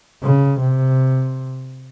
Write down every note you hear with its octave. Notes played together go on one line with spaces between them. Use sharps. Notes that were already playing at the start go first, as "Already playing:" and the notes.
C#3
C3